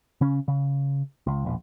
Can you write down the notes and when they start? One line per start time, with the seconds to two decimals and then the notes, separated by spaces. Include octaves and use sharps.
0.21 C#3 C#4
0.48 C#3
1.27 C#2
1.45 E1 A#1